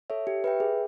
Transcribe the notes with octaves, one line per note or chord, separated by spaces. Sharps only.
A4 C#5 E5
G4
B4 E5 G5
G#4